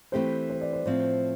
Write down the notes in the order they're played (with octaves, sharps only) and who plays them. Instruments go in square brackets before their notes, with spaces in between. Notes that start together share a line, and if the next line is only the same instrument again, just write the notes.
[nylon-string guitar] E3 A3 C4 G4 [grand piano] C5
[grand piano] C5
D5
C5
[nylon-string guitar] A2 F3 C4 [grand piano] C5